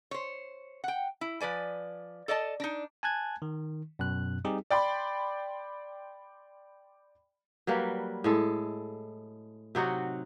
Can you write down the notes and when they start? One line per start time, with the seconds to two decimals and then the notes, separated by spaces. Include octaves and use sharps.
0.11 C5 C#5
0.84 F#5 G5
1.21 E4
1.41 F3 B4 D5 G#5
2.28 A4 D5 D#5 A5
2.60 D4 D#4
3.03 G#5 A5 F#6 G#6
3.42 D#3
3.99 F#2 B2 F#6
4.45 G3 C4 D#4 G4 G#4
4.70 D5 G5 B5 C6
7.67 F#3 G3 A#3 B4
8.24 A2 G#3 A4
9.75 C3 F#3 D#4 F#4